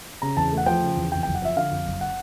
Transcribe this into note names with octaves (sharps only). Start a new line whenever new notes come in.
C#3 A#5
E2 A5
A3
F#5
F3 G5
C#3
E2
F2 G5
F#1 G5
F#5
F3 E5
D3 F5
F2
F#1
F#5